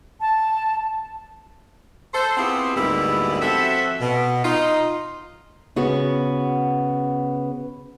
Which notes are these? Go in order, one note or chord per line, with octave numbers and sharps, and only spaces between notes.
A5
A4 C5
B3 C4 E4 F4 G4 G#4
D2 G#2 G3 A#3 B3 E4
F3 C4 F#4 A4 E5
B2
D#4 F4
C#3 B3 F#4